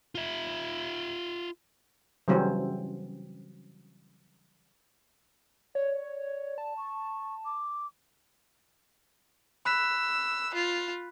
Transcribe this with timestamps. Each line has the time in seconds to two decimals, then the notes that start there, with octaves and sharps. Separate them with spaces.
0.15 F4 E5
2.28 C#3 E3 F#3 G3 C4 C#4
5.75 C#5 D5
6.58 A5
6.77 C#6
7.45 D6
9.65 B5 E6 F#6 B6
10.54 F4